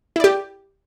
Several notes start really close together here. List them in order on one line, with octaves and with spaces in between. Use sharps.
E4 D5 G4